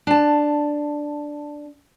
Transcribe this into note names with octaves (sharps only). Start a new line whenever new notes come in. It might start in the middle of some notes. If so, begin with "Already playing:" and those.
D4 A5